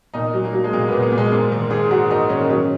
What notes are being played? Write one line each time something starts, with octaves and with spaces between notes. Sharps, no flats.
A#2 D#4
F#3
A#3
F#3
G#3
A#2 A#3
A#2 B3
A#3
A#2
G#3
G#2 A#3
D#3
G#2 G#4
G#2 F#4
D#3 D#4
D#3 C#4
D#4
F#3 C#4